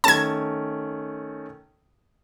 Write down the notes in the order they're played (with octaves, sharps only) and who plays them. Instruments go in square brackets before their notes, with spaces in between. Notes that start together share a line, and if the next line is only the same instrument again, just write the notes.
[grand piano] D#3 A3 C#4 [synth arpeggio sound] A5 G#6